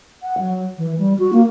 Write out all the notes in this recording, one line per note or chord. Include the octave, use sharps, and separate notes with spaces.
F#5
F#3
E3
G3
F#4
A#3